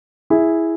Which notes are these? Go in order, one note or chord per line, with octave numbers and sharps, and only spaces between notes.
E4 G#4